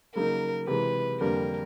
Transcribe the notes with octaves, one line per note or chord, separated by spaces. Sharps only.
C#3 F#3 A#3 D#4 A#4
C3 E3 G#3 B4
F2 D3 G3 A#3 A#4